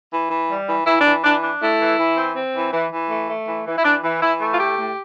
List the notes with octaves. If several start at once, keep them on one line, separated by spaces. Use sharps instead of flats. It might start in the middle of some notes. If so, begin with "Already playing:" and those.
E3
E3
G3
E3
E3 E4
D4
E3
E3 D4
D4
A3 E4
E3
E3
C4
C4
E3
E3
E3
A3
A3
E3
E3
E4
E3 D4
E3
E3 E4
A3
F4
A2 G4
A2